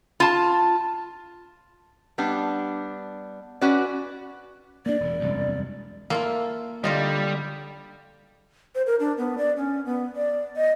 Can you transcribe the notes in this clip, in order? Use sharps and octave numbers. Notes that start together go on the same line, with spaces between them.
F4 A5
G3 B3 D4
C#4 F#4 B4 D5
A#3 D4 D5
E1 A#2
E1 C2 F#2
A#3 E4 F4 A4
D3 G3 D#4 F4 D#5
C5
A#4
D4
B3
D5
C#4
B3
D5
D#5